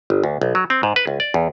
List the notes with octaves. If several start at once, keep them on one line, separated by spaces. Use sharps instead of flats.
G1
D2
B1
F#3
C4
G#2
B4
C#2
D5
E2